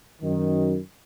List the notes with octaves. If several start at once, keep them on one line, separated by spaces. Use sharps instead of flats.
F#2 D#3